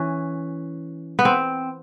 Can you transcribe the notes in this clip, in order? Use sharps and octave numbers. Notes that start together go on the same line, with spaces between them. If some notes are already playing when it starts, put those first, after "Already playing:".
Already playing: E3 C#4
B3
C4